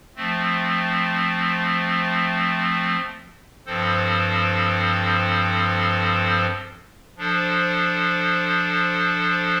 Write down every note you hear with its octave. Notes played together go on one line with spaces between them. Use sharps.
F3 A3 C4
G2 F3 C4 A4 C5
F3 D4 A4 C5